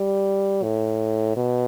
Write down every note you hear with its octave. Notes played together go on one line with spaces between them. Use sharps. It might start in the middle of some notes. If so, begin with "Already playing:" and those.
Already playing: G3
A2
B2